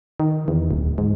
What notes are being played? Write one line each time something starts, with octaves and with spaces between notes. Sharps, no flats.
D#3
E2
D1
G#2